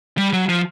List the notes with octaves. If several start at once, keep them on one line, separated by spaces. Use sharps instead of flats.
G3
F#3
F3